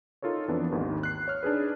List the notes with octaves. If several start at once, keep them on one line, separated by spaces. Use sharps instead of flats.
D#4 F4 A4 A#4 C#5
F2 E3 B3 D4
G#1 D#2 D#3
F#6 C7
C#5 F6
D4 D#4 G#4 B4